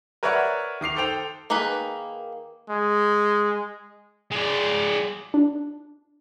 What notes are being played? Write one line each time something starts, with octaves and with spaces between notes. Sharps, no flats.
A#4 B4 C#5 D5 E5 F#5
D#3 D6 C7 F7
A4 C5 G5 F7
D#3 A#3 G#4 B4 B5
G#3
G#3 D5
D4